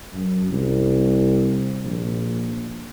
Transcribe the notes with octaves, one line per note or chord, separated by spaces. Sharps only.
F#2
C2
A#1